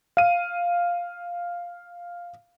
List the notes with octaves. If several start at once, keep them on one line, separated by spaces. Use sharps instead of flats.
F5 D#7